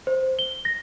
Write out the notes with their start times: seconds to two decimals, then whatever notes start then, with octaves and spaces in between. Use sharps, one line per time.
0.07 C5
0.39 G7
0.65 A#6